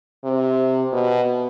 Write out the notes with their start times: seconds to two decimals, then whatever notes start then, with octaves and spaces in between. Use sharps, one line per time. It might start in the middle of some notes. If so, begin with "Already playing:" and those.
0.24 C3
0.92 B2